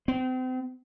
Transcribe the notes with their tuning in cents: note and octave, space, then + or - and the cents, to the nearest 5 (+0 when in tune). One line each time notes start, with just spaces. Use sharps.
C4 -35